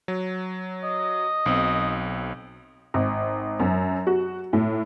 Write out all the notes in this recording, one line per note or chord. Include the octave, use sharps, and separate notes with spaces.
F#3
D#5
B1 C4
G#1
F#2
F#4
A2